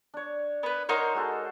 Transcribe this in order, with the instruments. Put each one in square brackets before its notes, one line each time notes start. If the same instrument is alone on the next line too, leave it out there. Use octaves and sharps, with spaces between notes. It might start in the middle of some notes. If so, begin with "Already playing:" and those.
[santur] D4 C#5
[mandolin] B3 B4
[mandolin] D#4 A#4 C#5 [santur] C5 F#5 C6
[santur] G#3 F#4 A4